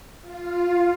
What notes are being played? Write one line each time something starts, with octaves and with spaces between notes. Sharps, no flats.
F4